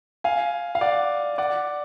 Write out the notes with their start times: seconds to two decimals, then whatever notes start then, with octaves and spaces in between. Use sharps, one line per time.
0.24 F5 G#5
0.75 F5
0.81 D5 F#5
1.38 D5 F#5